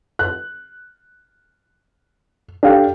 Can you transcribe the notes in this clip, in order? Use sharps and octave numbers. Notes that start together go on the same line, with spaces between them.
F#6
D4 G4 A4 F5